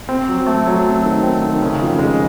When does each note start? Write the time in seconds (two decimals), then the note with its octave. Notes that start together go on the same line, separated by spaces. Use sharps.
0.09 C4
0.28 F#3
0.47 A3
0.66 F#3
0.85 C4
1.03 D#3
1.23 C4
1.42 D#3
1.62 C#3
1.80 F2
1.99 G#3